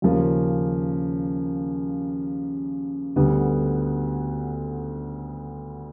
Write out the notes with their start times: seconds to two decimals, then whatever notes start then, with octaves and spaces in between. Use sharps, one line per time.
0.02 D#2 C#3 F3 A#3 C#4
3.16 D2 D3 G3 B3